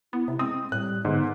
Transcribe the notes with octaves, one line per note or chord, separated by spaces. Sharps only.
B3 E4
C3 E4
G#3 C4 D#6
A2 G3 F#6
G#2 D3 B3